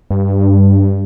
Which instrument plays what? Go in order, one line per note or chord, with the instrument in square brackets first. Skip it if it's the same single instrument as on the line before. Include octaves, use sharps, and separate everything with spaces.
[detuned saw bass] G2